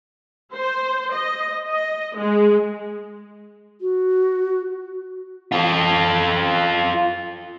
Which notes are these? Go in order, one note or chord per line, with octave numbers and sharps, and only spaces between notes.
C5
D#5
D#5
G#3
F#4
F4 A4